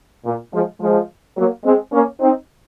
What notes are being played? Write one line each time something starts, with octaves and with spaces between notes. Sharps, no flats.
A#2
F3 G#3
F3 G#3
F#3 A#3
G#3 C4
A#3 C#4
C4 D#4